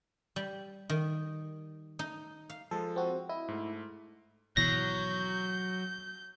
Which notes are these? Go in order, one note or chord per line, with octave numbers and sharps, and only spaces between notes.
G3
D#3
D#4
F5
F3 G#3 A4
C4 F#4
E4 D#5
G#2 A3
G#1 B2 E3 F#3 G6 A#6